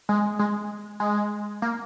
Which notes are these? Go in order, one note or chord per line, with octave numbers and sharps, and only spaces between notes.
G#3
G#3
G#3
A#3